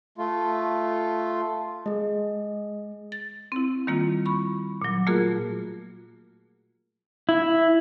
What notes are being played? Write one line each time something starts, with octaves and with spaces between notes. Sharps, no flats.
A3 F4
G#3 G#4 D#5
A6
C4 E4
D#3 G3 A#3 E4 F4
B5 C#6
A#2 F#3
A3 A#3 F4 F#4 G#4 A#4
E4